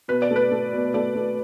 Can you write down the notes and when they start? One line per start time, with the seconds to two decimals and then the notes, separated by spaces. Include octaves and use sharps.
0.08 B2 B4
0.22 D5
0.31 A3
0.36 B4
0.51 A3
0.73 B2
0.94 A3 D5
1.15 A3